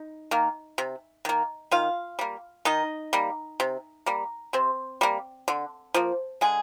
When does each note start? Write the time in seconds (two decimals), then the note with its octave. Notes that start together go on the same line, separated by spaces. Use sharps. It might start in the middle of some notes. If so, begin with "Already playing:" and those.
Already playing: D#4
0.31 D#3 A#3
0.78 C3
1.25 D#3 A#3
1.71 D#3 F4 F5
2.19 G3 A#3
2.65 D#3 D#4 D#5
3.13 G3 A#3
3.60 C3
4.06 G3 A#3
4.53 C3 C4 C5
5.01 G3 A#3
5.48 D3
5.94 F3 A#3
6.41 D3 G#3 G#4